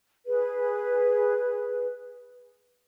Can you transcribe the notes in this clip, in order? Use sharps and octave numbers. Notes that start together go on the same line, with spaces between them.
G#4 B4